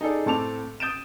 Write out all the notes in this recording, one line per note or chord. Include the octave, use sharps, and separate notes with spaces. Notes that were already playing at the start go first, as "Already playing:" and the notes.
D#4 G#4 A4 D5
A2 C4 A4 A5 D6 F7
D#6 G6 A6 D7 E7